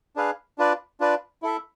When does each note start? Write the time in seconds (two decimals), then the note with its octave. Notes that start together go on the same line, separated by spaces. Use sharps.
0.16 D4 G#4 B4 F5
0.58 D4 F4 B4 D5
1.00 D4 F4 B4 D5
1.42 E4 A4 E5